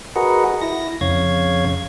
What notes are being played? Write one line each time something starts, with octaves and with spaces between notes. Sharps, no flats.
F#4 G#4 A#4 B4 D#5 F#5
E4 A#6
F2 C#3 C#5 F5 G#6